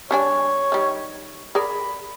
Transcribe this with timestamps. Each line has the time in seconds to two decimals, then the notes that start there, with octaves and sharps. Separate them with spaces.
0.11 G3 D4 C#5 G#5
0.72 D#3 G3
1.55 G#4 A#4 D5 B5